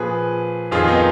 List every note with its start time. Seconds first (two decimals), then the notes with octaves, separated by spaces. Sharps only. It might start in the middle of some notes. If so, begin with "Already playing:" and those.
Already playing: A#2 F3 G#4 B4
0.71 F2 D#3 F4 G#4
0.88 B3 D#4